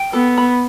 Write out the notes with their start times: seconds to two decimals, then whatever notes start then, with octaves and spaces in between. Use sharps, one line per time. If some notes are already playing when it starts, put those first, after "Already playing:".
Already playing: G5
0.13 B3 A4
0.38 B5